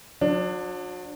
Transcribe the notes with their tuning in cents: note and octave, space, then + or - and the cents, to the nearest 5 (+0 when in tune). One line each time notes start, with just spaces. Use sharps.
F#3 -40 D4 +15